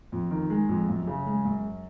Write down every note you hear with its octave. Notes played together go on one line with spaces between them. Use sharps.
F2
D#3
G#3
F2
F#2
C#3
G#3
F#2